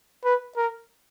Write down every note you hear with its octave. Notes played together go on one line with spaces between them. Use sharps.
B4
A#4